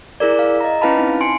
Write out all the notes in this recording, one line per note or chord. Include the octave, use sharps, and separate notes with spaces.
E4 G#4 A#4 D5
F5
D#5 A#5
C#4 E4 B4 F5 A5 B5
C4 D#4
G#5 C6 C#7 D7